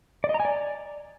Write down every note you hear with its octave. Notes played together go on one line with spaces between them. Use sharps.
D5
D#5
A#5
G#5
D5